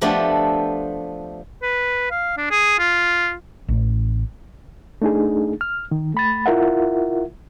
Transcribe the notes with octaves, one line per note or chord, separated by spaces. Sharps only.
F3 A3 B3 D4 G4
B4
F5
D4
G#4
F4
A1
A3 D4 D#4 G#4
F6
D#3
A3 B5 A6
E4 F4 A#4 E5 F#5